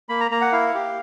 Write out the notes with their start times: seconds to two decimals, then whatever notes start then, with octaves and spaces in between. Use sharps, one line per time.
0.09 A#3 B5
0.20 A#5
0.31 A#3 A#5
0.41 F#5
0.52 E4 F5
0.75 G4